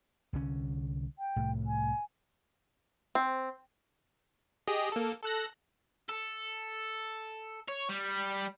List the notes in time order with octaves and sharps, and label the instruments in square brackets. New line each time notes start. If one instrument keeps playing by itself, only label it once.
[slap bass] C2 D3 C#4
[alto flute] G5
[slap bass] C2 A2
[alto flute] G#5
[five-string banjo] C4
[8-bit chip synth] G4 G#4 D#5
A#3 A4
A4 F#6 A#6
[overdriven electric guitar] A4
C#5
G3